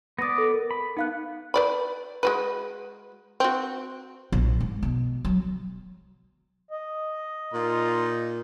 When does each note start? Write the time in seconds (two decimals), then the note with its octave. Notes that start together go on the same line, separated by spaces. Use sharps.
0.19 B3 B4 D5 D#6 A#6
0.38 A4
0.54 A#4
0.71 B5
0.97 B3 D#4 F5 F#6
1.54 B4 D5 B5
2.23 G#3 F#4 B4
3.40 C4 F#4
4.32 A#1
4.60 G#2
4.83 B2
5.25 F#3
6.71 D#5
7.54 A#2 D#4 F4 A#5